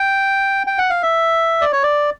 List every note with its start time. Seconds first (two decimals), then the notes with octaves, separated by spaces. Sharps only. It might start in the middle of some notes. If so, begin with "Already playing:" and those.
Already playing: G5
0.67 G5
0.78 F#5
0.90 F5
1.03 E5
1.61 D5
1.72 C#5
1.83 D5